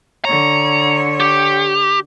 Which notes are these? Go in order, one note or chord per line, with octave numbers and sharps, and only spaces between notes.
D3 C#5 A#5
G4